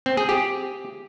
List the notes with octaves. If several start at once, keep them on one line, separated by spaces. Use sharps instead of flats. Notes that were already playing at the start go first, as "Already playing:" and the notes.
C4
G#4
G4